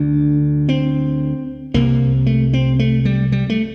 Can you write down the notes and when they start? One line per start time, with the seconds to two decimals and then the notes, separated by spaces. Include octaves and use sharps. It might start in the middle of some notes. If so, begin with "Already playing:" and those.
Already playing: D2 D3 D4
0.69 C4
1.74 C2 C3 A#3
2.26 A3
2.53 C4
2.79 A3
3.05 G3
3.32 G3
3.50 A3